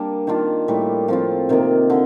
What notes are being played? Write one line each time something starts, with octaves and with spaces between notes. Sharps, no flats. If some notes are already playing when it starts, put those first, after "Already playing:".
Already playing: G3 A#3 D4
D#3 A#3 D4 F4
A2 G3 A#3
F3 C4 F4
C3 D#3 A#3
D3